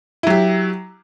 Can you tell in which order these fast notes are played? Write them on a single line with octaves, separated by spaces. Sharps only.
E4 F#3 G4